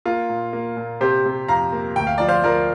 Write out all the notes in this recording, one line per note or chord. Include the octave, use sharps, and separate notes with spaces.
A#3 F4
A#2
A#3
A#2
C3 G4 C5
C3
F2 F5 A#5
A#3
D2 G5
F5
F3 D5
C5 F5
F3 A#4 D5